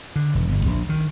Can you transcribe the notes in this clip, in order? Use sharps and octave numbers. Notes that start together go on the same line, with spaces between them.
D3
E1
G1
A#1
D#3